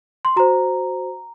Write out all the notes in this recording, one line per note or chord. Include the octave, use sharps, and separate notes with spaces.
C6
F#4 C5 A#5